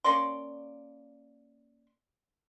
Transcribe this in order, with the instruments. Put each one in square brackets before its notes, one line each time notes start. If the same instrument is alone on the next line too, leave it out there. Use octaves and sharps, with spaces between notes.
[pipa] A#3 C#4 D5 C6